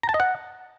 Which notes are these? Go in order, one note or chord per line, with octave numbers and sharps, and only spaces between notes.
A#5
A5
D#5
F#5